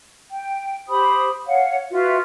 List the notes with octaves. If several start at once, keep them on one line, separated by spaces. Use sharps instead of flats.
G5
G4 C5 B5 D#6
C#5 F5 F#5
F4 F#4 B4 E5